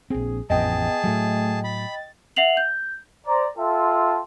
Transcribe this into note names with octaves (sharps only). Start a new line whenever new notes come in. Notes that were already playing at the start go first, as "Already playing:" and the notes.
A#1 C4 G#4
A1 F2 B3 G#4 D#5 G5 A5
A2 F#3 A3
B5 A6
E5 F#5 C7 F7 F#7
G6
C5 D5 A#5
F4 A4 E5 G5 A5 C6